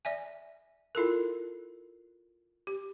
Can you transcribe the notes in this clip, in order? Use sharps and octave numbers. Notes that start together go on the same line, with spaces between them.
D5 E5 G#5
E4 F4 A4 A#4
G4